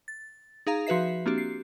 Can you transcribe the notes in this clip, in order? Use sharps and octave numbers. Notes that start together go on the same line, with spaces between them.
A6
D#4 G#4 F5 A#5
F3 F#4 B4 E5 C7
A#3 C4 D4 F#4 G4
C7